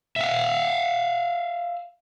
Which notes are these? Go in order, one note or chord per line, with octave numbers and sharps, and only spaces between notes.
E5 F5